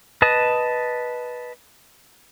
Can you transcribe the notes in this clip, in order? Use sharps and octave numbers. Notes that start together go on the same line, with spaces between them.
B4 D#5 A5 D#6